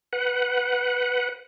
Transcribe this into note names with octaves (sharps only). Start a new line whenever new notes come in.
B4 F#5